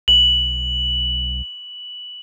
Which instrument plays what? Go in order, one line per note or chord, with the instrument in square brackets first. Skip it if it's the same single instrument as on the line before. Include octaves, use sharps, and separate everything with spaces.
[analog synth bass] B1 [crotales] F#7